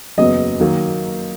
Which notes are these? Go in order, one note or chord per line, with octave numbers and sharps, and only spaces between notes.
F#1 E2 C#3 F#3 B3 D#5
D#3 F#3 A#3